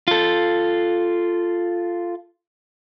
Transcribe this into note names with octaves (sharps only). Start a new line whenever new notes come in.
F4 A4